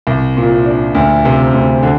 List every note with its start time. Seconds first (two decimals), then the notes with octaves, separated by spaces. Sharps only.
0.07 C2
0.37 A#2
0.66 D4
0.95 D2
1.25 C3
1.54 D2
1.83 D3